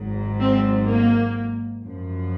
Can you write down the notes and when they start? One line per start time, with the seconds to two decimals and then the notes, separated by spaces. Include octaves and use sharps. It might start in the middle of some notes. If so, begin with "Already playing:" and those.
Already playing: G#1 G#2 F#3
0.40 C4
0.87 A#3
1.83 F#2 F3